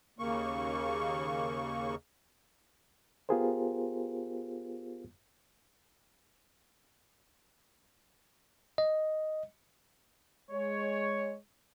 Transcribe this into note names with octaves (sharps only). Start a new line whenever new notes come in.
D#2 C#3 A#3 C#6
B3 F4 G4 G#4 A#4 C5
D#5
G#3 C#5